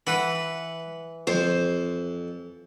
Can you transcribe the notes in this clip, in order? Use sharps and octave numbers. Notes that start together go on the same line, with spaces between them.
E3 B4 F#5 B5
F2 C5